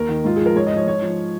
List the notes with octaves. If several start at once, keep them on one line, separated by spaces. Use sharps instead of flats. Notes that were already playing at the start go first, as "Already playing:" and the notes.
Already playing: D#2 A#4
D#3
G#2 F4
F3 G#4
A#4
G#2 C#5
D#5
F3 C#5
G#2 C#5
F3